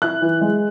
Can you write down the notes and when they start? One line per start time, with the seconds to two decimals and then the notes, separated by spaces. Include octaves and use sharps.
0.02 E4 F#6
0.22 E3
0.41 G#3